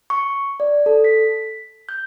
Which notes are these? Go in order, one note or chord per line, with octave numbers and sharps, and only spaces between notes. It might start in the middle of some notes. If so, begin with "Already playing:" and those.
C#6
D5
A4
B6
G6